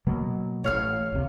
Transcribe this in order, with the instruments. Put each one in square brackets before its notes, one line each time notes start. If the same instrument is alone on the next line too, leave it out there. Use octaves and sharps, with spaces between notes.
[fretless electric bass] B2 F#3 A#3
[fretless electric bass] A1 A2 [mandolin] C#5 F5 F6
[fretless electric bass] F#1 D2 C3